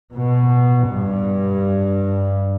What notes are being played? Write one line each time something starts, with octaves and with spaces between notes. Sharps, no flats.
B2
G2